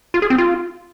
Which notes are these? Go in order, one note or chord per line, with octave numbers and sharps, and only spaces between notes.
F4
G#4
C4
F4